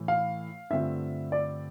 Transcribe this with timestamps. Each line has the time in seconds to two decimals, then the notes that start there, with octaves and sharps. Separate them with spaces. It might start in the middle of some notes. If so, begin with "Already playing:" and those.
Already playing: A2 E3 A3 E4
0.08 F5
0.70 G2 D3 A3 C4 F4 E5
1.32 D5